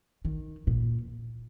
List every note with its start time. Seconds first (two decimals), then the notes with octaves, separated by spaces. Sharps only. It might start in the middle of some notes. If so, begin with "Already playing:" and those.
0.25 D#3
0.67 A#2